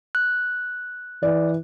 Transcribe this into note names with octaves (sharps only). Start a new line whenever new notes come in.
F#6
E3 D5